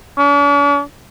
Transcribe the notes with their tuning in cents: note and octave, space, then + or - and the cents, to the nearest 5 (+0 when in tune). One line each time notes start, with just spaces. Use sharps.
D4 -45